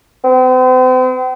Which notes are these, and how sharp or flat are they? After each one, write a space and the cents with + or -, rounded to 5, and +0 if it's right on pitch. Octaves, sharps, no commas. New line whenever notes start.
C4 -40